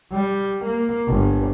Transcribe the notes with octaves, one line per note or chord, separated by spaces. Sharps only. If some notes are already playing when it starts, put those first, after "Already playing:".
G3
A#3
G1